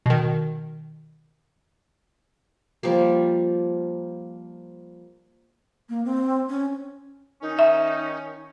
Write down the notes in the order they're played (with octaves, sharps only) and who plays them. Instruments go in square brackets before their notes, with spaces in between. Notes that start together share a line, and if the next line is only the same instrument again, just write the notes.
[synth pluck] B2 D#3
[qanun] F3 G3 A#3
[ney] A#3
C4
C#4
[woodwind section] D#3 C#4 [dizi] D#4
[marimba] E5